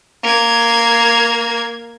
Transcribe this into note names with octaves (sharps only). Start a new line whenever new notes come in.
A#3 G#6